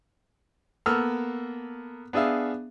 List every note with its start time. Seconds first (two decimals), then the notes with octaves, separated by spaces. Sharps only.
0.86 A#3 B3 A4 E6 F6
2.13 B3 D4 G#4 E5 F5